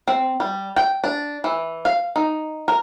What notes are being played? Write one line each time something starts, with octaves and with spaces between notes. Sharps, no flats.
C4
G3
G5
D4
E3
F5
D#4
A#4